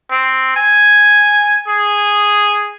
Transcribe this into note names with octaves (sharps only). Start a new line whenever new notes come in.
C4
G#5
G#4